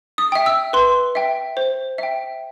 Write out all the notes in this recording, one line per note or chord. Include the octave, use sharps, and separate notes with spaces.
D#6
E5 G5
E6
B4 C6
E5 G5
C5
E5 G5